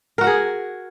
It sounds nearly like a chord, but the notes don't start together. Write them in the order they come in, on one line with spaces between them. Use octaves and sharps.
A#4 F#4 F#5 G#4